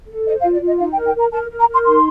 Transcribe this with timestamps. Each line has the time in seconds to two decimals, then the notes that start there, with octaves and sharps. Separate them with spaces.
0.08 A4
0.26 C5 D#5
0.40 F5
0.44 F4
0.52 D5
0.61 F4
0.67 D#5
0.79 D#4 F5
0.92 G5
0.97 A#4
1.06 G5
1.15 A#4 A#5
1.32 A#4 A5
1.50 A#4
1.59 A#5
1.68 A#4 C6
1.85 D#4 C6